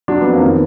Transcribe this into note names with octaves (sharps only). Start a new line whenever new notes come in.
F#3 D4
F2 B3
A#3
D#3 B3